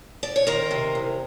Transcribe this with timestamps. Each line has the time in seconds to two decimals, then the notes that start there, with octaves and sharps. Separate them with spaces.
0.23 D5
0.36 C#5
0.47 D#3 A#4 C5
0.71 C3
0.95 E2